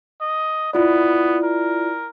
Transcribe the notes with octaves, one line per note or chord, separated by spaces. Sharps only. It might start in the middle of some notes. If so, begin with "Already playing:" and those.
D#5
B3 E4 F4 D5
A#4